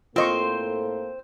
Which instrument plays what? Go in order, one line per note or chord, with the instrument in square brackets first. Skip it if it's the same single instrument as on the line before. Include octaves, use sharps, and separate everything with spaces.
[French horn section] A2 A#3 A4 [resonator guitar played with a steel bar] C4 C5 [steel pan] F4 D#5 C#6